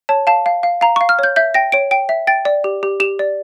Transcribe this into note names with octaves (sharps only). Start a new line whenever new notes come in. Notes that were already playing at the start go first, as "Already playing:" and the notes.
C#5 A5
F5 A5
F5
F5
F5 A#5
F5 C#6
F6
C#5 G6
E5 G6
G5 A#6
C#5 D7
G5 D7
E5
G5 A6
D5
G4
G4
G4 E7
D5